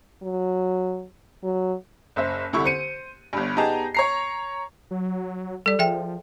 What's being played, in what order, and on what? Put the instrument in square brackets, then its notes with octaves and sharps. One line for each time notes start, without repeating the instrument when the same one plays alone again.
[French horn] F#3
F#3
[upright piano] F#1 C5 E5
C2 D3 E4 C#6
C5 C#7 D#7
G1 G2
B3 D#4 G4 G#4 A5 A#5
C#5 A#5 C7
[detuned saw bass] F#3
[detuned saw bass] G3 [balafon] A4 D5
[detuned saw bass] F3 [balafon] G#4 E5 G5